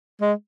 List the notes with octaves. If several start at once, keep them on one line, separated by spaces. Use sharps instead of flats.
G#3